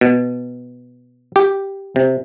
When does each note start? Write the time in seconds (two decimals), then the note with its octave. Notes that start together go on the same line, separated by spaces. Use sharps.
0.01 B2
1.36 G4
1.96 C3